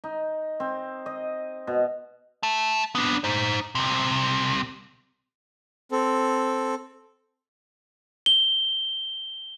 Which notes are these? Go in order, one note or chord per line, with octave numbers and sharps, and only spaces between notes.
D#4
C4
D#5
B2
E5 A5
B3 D4
D#4 C5
C2 C3
C4 A4
G7